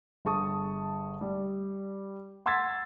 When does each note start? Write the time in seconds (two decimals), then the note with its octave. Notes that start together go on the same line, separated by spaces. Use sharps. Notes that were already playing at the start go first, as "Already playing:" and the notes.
0.25 G1 G#4 A5 C#6 D#6
1.21 G3
2.46 F#5 C6 E6 G#6 A6 B6